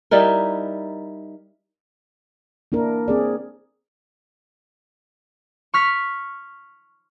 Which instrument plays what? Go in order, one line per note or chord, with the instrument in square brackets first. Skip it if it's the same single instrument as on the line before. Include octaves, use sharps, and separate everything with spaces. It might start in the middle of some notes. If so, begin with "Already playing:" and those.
[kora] G3 D#4 E4 A#4
[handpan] A#3 D4 E4 A#4
C4 G#4 D5
[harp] C#6 F6 B6